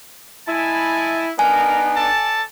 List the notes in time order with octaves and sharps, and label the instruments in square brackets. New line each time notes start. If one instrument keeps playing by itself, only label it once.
[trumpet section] G#3 G#5 A5 [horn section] E4
[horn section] B3 D4 D#4 [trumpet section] A#4 [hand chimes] G#5
[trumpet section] A4 D5 A5